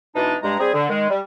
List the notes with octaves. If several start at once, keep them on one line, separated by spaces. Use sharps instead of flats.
B2 E3 D4 D#4
G2 G3 G#3 A#5
G3 C4 G#4
D3
D#3 G#3
G3